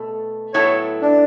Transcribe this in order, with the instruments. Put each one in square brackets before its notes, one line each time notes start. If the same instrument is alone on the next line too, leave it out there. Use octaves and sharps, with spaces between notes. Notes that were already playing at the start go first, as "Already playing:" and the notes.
Already playing: [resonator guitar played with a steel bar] B2 A3 A4
[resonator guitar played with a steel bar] A2 F#3 B3 E4 A4 [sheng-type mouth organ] C#5
[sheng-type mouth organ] D4